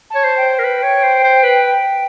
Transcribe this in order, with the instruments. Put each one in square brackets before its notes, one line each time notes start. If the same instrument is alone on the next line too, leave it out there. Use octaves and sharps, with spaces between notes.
[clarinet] C#5 [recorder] A5
[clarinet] C5
[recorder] G5
[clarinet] A#4
B4
C#5
C5
C5
B4